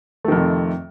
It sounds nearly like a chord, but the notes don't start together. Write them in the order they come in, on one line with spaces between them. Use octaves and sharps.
A3 D#3 F2 C3